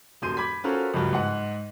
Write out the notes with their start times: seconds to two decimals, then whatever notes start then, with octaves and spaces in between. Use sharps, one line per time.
0.22 D#1 F#2 C6 G6 D#7
0.37 B5 D6 G#6 B6
0.64 C#4 F4 F#4 A4 A#4 C5
0.94 C#2 G2 F#3
1.13 G#2 F#5